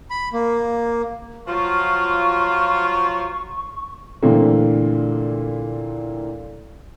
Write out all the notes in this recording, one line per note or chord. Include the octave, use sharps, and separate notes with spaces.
B5
A#3
F3 F#3 F4 C#6
A#2 D3 E3 A3 A#3 C4